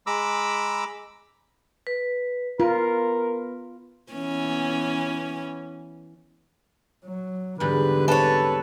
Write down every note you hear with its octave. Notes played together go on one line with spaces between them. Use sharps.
G#3 A#5 B5 D6 E6
B4
B3 F4 A#4 B4
E3 B3 C#4
F#3
E2 G#2 D3 G3 B4
C4 A4 B4 C#5